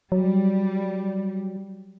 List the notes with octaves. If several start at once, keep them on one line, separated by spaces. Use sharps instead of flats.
F#3 G3